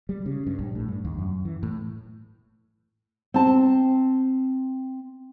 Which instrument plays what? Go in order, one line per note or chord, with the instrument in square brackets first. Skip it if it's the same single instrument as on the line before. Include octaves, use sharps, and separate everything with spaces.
[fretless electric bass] G3
C#3
G2
A#1
A2
G2
D#2
F#2
E3
A2
[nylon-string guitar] C4 A5